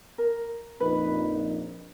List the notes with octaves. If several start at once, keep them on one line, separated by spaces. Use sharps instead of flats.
A#4
A#1 F2 D#4 B4